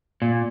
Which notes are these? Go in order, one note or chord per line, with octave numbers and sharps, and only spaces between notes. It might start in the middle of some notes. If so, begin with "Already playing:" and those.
A#2